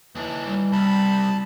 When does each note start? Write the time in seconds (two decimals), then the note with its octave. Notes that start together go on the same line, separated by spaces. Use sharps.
0.15 D#2 E3 D4
0.44 G3
0.72 C2 A5 B5